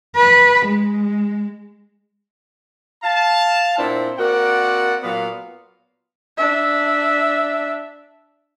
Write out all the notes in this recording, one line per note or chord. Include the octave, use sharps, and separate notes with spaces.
B4
G#3
F5 A5
A#2 B3 C4 D4 E4
A#3 C4 F#4 A#4 D5 F#5
A#2 F#3 B3 F5
D4 E5